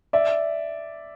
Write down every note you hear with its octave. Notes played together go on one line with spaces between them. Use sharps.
D5 E5